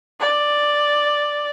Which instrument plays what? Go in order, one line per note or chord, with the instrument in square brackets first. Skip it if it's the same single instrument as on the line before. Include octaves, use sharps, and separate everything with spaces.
[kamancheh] D5